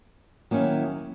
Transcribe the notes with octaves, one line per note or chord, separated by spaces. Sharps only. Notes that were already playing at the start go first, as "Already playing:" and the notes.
D#3 F#3 A#3 C#4 E4